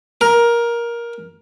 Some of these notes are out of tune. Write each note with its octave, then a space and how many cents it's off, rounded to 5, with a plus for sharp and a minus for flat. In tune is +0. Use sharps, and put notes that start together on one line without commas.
A#4 +15